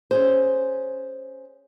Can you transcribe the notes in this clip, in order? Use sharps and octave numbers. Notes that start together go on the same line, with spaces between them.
C#4 G#4 C5